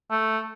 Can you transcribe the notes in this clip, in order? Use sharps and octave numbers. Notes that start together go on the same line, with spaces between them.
A3